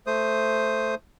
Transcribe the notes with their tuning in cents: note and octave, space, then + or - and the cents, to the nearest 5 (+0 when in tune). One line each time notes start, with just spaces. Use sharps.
A3 +0 C5 +0 D#6 +0